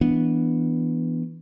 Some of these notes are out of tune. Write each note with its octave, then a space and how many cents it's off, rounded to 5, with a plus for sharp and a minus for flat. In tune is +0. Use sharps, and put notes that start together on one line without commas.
E3 +0 B3 -10 D4 +0